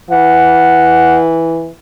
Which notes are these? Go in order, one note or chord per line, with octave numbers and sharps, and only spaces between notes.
E3 F#5